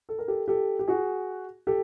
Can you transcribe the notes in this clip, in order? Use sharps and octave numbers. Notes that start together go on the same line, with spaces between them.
A4
A#4
G4 A4
G4 A4
G4
F#4 G#4
G4 A4